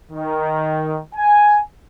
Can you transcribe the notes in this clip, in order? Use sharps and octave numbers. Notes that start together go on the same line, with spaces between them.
D#3
G#5